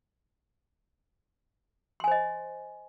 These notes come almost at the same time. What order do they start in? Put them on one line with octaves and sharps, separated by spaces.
C6 G#5 C5 D#5